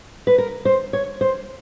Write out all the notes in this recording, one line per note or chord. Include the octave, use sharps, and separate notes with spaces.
B4
A#4
C5
C#5
C5